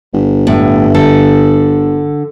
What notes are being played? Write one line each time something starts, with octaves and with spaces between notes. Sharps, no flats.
G1
A2
D3 A4